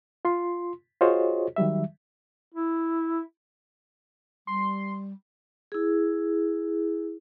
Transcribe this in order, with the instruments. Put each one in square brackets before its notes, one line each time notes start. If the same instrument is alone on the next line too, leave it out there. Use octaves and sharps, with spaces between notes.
[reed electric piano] F4 C6
F4 F#4 G#4 C5 C#5 D#5
D#3 F#3 G3 E5
[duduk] E4
[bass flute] G3 [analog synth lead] C6
[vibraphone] E4 G#4